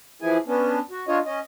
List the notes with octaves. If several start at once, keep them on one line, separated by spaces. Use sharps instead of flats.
E3 F3 E4 G#4 G#5
B3 C#4 D4
F#4
D4 F4 C#5 D#5
C#4 D#5